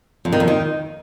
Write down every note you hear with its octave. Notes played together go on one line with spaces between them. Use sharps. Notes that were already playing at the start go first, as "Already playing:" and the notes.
F2
D#3
F2
D#3